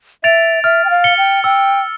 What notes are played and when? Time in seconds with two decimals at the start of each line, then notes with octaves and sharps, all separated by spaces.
0.24 E5 A6 D7 F7
0.64 E5 F6
0.85 G5
0.90 F5
1.04 C#7 G7
1.18 G5
1.44 G5 E6